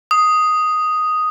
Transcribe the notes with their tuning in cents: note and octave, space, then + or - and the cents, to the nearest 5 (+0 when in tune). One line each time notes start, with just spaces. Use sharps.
D#6 +0